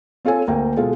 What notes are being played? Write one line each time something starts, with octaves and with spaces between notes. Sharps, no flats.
C4 F4 A4 C#5 G#5
D2 A#3 A#4 G5
B2 G#3 F4 A4